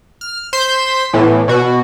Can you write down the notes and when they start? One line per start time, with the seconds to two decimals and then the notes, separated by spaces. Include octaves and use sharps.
0.21 F6
0.53 C5 C6 G6 B6
1.13 A2 E3 B3
1.48 B2 F#4